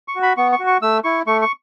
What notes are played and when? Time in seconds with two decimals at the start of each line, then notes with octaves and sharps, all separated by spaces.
0.08 C#6
0.16 F#4
0.23 B5
0.37 B3 C#6
0.52 C#6
0.60 F#4
0.67 C#6
0.82 A3 E6
1.04 E4 C#6
1.27 A3 C#6
1.42 C#6